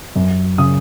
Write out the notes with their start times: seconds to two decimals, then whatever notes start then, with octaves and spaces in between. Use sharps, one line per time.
0.16 F#2
0.58 C#3 D#6